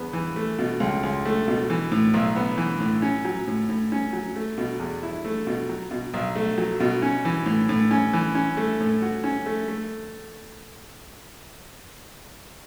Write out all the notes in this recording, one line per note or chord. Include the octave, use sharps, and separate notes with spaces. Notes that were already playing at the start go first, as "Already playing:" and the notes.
Already playing: E2 B3
E3
A3
B2
C#2
C#2
A3
B2
E3
A2
B1
B3
E3
A2
C#4
F#3
A2
A2
C#4
F#3
A3
B2
E2
E4
A3
B2
F#3
B2
B1
A3
F#3
B2
C#4
E3
A2
A2
C#4
E3
C#4
A3
A2
F#4
C#4
A3
A3